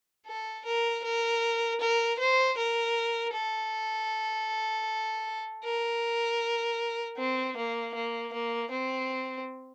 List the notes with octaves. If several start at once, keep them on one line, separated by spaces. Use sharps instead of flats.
A4
A#4
A#4
A#4
C5
A#4
A4
A#4
C4
A#3
A#3
A#3
C4